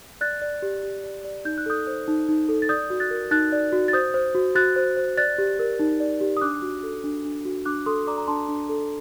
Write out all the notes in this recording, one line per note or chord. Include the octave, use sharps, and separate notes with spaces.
D5 F#6 A6
D5
G4
G4
D5
D5
D#4 G6
F#6
A4 D#6 G6
C5
D#4
D#4
A4
A6
D5 D#6 G6
F#4
F#6 A6
A#4
D#4 F#6 A6
D5
F#4
A6
C5 D#6 G6
C5
F#4
F#4 F#6 A6
C5
C5
D5 F#6 A6
G4
A#4
D#4
D5
G4
D#6
D4 D6 F#6
F#4
A4
D4
D4
F#4
D4 D6 F#6
A4 C6 D#6
D5 A#5 D6
A#5
D4 A5 C6
D4
A4